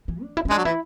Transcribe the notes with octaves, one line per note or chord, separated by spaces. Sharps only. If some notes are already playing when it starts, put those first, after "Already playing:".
E3
D4
E4
C#4
G#3 D4
F#3
E3 E4